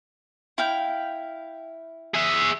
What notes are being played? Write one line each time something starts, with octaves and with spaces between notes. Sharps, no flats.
E4 F5 G5
G#4 E5